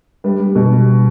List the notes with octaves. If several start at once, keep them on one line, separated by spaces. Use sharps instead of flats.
G3 B4
G3
B2